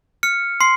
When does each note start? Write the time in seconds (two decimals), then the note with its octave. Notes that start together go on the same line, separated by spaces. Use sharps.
0.23 F6 C#7
0.61 C6 C7